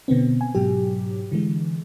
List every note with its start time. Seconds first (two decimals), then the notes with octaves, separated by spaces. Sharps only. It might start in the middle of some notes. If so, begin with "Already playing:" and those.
0.08 B2 D3 B3 C4
0.41 G#5
0.55 G#2 B2 F#3 G4
1.32 D3 E3 G#3